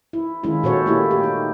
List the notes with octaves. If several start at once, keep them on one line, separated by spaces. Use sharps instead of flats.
E4
D#3 G#3 C#4 E4 F4
A#2 F#4 A4 C5 C#5
A3 A#3 E4 G4
G4
D#4